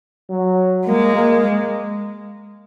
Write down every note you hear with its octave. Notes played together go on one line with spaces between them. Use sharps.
F#3
G#3 A#3
A#3